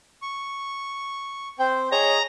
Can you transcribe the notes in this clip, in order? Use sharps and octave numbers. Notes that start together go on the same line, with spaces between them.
C#6
C4 C5 G5
G#4 C#5 D#5 A#5